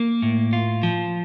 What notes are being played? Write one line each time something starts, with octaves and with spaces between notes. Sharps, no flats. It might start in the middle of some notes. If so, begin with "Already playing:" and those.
Already playing: A#3
A2
F4
F3